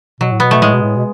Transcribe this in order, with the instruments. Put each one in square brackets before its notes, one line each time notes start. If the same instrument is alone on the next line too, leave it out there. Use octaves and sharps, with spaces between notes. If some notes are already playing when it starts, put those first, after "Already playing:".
[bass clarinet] B2 [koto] F#3
[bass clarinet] A2
[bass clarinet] B2 [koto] B3
[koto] A3
[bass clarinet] A2 [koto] G#3
[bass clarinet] B2
A2
B2